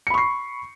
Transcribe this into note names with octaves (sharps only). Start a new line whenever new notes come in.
B5 C#6 C7 C#7